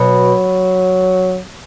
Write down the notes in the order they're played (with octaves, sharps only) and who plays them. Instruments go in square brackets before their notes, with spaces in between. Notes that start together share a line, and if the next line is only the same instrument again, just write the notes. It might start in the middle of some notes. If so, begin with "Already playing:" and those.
Already playing: [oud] B2 [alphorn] F#3